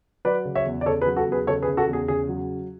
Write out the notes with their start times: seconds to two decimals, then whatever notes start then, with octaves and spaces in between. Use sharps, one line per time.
0.25 F#3 B4 D5
0.45 C#3
0.55 C#5 E5
0.65 E2
0.81 D5
0.86 C#3 A4 C#5
1.01 G#4 B4
1.07 F#3
1.17 F#4 A4
1.27 E2
1.32 G#4 B4
1.47 C#3 A4 C#5
1.62 G#4 B4
1.67 C#3
1.77 F#4 A4
1.88 E2
1.93 G#4
2.08 C#3 G#4
2.29 F#3